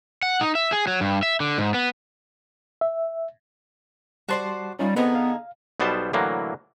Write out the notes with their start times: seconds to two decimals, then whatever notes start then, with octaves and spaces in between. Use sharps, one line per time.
0.23 F#5
0.41 D#4
0.55 E5
0.72 G#4
0.87 F#3
1.01 G2
1.23 E5
1.40 D3
1.58 G#2
1.74 B3
2.81 E5
4.29 G3 F#4 C5 D5 A5 C6
4.79 G3 C#4 D#4 F4
4.96 D3 B3 C4 D#4 G#4 B4
5.15 F5
5.80 B1 B2 G3 B3 C5 A5
6.13 A2 D3 E3 F#3 A#3